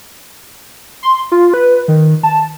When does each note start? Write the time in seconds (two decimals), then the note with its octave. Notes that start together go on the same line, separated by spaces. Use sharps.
1.03 C6
1.32 F4
1.54 B4
1.88 D#3
2.23 A5